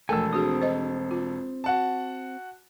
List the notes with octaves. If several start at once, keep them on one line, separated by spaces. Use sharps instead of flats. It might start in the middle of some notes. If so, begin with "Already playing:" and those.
E1 F3 A3 A4 A#4 G#5 E6
C4 D4 F#4 G#4 D#6
C5 D#5
F4
F#4 F#5 A5